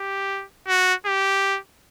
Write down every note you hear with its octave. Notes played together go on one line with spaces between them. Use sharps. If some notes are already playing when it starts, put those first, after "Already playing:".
Already playing: G4
F#4
G4